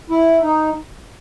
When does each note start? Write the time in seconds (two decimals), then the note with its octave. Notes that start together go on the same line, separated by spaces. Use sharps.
0.10 E4
0.42 D#4